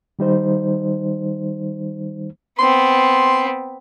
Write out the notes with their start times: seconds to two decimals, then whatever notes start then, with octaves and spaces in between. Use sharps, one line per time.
0.19 D#3 G3 D#4 C5
2.59 B3 C4 C6